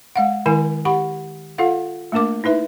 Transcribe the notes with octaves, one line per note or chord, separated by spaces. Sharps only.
G#3 F5 F#5
D#3 G#3 E4 A#4 G#5
G4 F#5 B5 C#6
F4 A4 F5 F#5
A3 A#3 D4 A#4 D6
D#4 E4 B4 E5